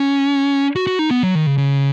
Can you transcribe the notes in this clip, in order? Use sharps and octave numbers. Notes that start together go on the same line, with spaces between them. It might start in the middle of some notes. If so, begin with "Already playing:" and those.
Already playing: C#4
F#4
F#4
D#4
B3
F#3
D#3
C#3
C#3